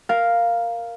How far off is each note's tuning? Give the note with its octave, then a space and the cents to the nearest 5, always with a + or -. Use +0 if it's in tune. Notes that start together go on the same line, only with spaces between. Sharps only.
A#4 +0 F5 +0